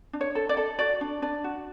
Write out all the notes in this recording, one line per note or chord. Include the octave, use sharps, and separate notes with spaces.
D4
C#5
A4
D5
A4
F#4 D5
D4
D4 D5
F#4